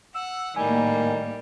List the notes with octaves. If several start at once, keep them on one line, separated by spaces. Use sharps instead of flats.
F#5 E6
A2 D#3 G3 A#3 G#5